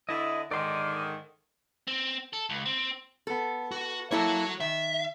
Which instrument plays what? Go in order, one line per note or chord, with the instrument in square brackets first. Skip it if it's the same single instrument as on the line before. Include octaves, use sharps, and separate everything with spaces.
[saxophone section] D3 E4 [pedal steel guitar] D#5
[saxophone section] G#2 D3 D#3 [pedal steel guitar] D5 C6
[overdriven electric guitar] C4
A4
C#2
C4
[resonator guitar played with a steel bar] B3 A4
[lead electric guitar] F#4
[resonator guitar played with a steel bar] A#3 E4 A4 [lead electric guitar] F#4 C#5
[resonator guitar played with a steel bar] D#3 [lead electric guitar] E5